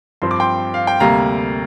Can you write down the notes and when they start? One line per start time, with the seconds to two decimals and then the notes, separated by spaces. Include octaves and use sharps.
0.22 G2 F3 C4 C6
0.31 D6
0.40 G5 C6
0.74 F5
0.87 G5
1.00 D2 C3 G3 A#3 F5 A#5